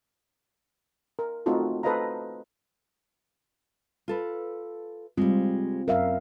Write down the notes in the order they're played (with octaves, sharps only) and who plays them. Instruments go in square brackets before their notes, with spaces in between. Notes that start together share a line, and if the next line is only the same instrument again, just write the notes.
[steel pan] A#4
A3 C4 D#4 F4 F#4 A4
A4 B4 C5 D#5 F5 A#5
[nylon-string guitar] F4 A4 B4
[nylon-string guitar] G3 G#3 [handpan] C4 F4
[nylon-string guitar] F#2 [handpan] A#4 E5 F5